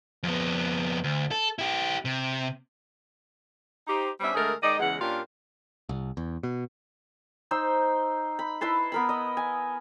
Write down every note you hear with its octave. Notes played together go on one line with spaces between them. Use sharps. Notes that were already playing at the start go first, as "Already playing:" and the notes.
F2 B3
D2
A4
E4 G4
C3
D#4 G4 C5
G3 B3 C#4 D4 C5 E5
D3 G#3 A3 G#4 A#4
D#3 G#3 D#4 D5 D#5
E2 C#3 E3 G#3 F#5
A#2 C#4 D4 F4 G4 A#4
C2
E2
B2
D#4 C5 E6
B5
E4 B4 A5 C6
B3 A#4 B5
D#5
G#5